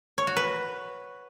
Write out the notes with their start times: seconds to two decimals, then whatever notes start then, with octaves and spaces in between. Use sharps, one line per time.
0.18 C#5
0.27 F#4
0.37 B4